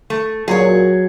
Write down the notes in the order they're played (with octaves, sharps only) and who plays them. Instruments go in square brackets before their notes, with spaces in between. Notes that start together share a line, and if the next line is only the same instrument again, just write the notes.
[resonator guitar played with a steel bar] A3
[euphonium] A#2 [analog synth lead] F#3 [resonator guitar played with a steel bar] G#4 C#5